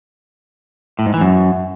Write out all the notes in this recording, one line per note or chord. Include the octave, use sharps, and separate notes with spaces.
A2
G#2
E3
F#2